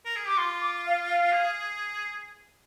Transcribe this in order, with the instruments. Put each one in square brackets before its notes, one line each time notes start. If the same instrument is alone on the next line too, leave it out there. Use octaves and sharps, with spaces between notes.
[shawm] A#4
G#4
[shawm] G4 [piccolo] D6
[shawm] F4 [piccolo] C6
[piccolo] D6
F5
F5
[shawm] G#4